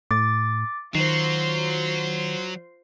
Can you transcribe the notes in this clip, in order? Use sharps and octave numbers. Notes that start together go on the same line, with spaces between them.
A2 D6 A6
D#3 F#3 F4 C5 C7